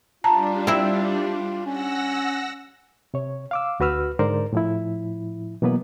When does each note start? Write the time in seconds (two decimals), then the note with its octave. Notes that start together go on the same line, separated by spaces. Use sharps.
0.24 G3 D4 F4 A5 A#5
0.67 C4 E4
1.66 C#4 F#5 E6 A#6
3.14 C3 C#5
3.51 F5 D6 E6
3.80 D2 F#4 B4 E6 F6
4.19 G#2 D3 A#4 C5 D5
4.53 A2 F3 E4
5.62 B2 E3 F#3 A#3 B3 B4